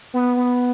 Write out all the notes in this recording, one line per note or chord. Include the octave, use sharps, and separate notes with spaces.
B3
B3